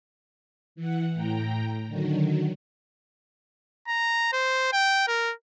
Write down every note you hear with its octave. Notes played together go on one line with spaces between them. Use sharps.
E3 F#5
A2 G5 A#5
D3 D#3 F#3
A#5
C5
G5
A#4